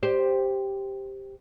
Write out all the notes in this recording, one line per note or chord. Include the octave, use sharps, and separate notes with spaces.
G4 C5